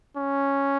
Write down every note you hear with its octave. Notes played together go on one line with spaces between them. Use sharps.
C#4